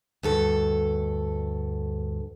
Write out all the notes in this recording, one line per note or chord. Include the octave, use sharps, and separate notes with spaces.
D2 G2 A4